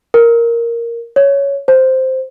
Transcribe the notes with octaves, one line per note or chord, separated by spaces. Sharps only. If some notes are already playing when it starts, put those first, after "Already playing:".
A#4
C#5
C5